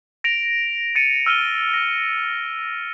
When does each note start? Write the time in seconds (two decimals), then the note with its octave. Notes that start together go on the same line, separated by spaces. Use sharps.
0.24 A#6 D7 F7
0.95 A6 C#7 D#7
1.26 E6 F6 D#7 G7
1.74 A#6